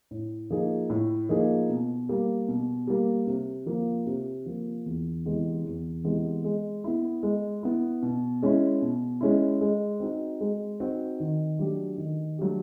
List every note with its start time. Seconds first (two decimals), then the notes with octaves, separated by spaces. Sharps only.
0.11 A2
0.50 F3 A#3 D#4 G#4
0.90 A2
1.29 F3 A#3 D#4 G#4
1.69 B2
2.09 G3 A#3
2.48 B2
2.87 G3 A#3
3.27 C3
3.66 F3 A#3
4.06 C3
4.46 F3 A#3
4.86 E2
5.25 C3 E3 G#3 B3
5.64 E2
6.04 C3 E3 G#3 B3
6.44 G#3
6.84 B3 E4
7.23 G#3
7.63 B3 E4
8.02 B2
8.42 G#3 C#4 E4
8.82 B2
9.21 G#3 C#4 E4
9.61 G#3
10.00 C4 D#4 F#4
10.40 G#3
10.80 C4 D#4 F#4
11.20 D#3
11.59 F#3 A3 D4 G4
11.98 D#3
12.39 F#3 A3 D4 G4